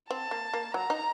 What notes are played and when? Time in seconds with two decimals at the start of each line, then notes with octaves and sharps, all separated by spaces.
0.11 C4 A5
0.31 A#3
0.54 A#3
0.74 F#3 A#5
0.90 D#4